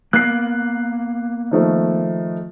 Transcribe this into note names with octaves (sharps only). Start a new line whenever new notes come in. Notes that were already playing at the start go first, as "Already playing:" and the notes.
A#3 B3 F#6 C7
D#3 F3 A3